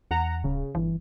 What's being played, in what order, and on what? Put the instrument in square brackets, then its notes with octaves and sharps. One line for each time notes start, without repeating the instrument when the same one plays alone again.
[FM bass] E2 [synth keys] F#5 A#5
[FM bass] D1 [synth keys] C#3
[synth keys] G1 [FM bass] E3